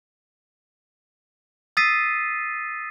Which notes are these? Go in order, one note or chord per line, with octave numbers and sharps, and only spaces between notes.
D#6 E6 A6 B6 C7 D#7